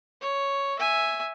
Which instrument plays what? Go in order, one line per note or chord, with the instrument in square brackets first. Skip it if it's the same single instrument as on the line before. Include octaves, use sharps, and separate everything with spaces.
[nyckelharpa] C#5
E5 G#5